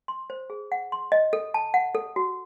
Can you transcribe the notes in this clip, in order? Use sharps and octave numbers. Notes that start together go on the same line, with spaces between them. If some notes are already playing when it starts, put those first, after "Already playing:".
C6
C5
G#4
F#5
C6
D#5
A4
A5
F#5
A4
F#4